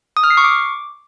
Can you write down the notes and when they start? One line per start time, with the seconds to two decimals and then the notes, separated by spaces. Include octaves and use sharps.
0.17 D#6
0.24 F6
0.30 C7
0.37 C#6
0.44 D6